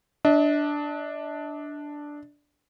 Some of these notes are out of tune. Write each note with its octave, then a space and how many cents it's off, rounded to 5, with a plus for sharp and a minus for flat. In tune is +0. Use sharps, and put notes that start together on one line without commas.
D4 +0 D#5 +45